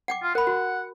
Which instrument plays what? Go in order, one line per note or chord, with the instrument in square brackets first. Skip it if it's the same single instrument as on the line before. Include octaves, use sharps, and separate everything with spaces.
[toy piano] F#5 G5 D6
[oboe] F4
[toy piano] A#4 B5 [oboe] F#5
[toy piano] F#4